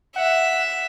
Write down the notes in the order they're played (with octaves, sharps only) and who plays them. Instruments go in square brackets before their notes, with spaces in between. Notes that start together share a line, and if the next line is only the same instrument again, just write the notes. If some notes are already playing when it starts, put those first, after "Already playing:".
[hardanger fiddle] E5 [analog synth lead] F#5